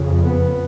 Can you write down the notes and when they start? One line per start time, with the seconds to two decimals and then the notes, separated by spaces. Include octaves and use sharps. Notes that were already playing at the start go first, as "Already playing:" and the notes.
Already playing: F2 C#3
0.24 B3